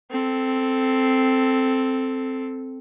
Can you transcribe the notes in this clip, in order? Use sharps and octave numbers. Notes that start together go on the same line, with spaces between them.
C4 A4